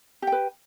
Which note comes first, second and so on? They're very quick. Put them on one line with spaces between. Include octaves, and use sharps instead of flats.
G4 G5 B4